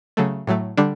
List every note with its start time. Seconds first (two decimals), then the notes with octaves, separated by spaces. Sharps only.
0.17 C#3 F#3 A3
0.47 A2 F#3 A3
0.77 D3 G3 D4